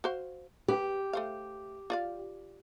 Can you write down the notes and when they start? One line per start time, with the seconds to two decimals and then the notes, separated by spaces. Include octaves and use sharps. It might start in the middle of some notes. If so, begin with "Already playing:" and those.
0.04 F#4 C5 F5
0.68 G4 B4
1.13 A3 C5 F5
1.90 F4 D5 F5